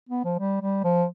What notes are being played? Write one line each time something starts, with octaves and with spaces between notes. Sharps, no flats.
B3
F3
G3
G3
F3